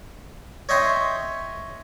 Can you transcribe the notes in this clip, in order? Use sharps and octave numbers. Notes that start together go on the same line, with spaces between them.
C#5 D#5 E5 G5 C6